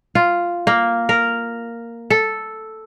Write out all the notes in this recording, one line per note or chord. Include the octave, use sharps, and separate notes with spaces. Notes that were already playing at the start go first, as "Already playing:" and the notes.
F4
A#3
A#4
A4